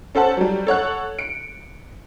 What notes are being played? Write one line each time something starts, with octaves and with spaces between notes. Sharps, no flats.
C#4 A4 C5 F#5 A5
F#3 G3
A4 C#5 F#5 F#6
C#7 D7